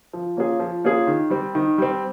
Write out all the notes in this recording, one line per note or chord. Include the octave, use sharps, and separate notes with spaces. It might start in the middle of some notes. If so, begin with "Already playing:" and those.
F3
A#3 C#4 F4 G#4
F3
A#3 C#4 F4 G#4
D#3
G3 C4
D#3
G3 C4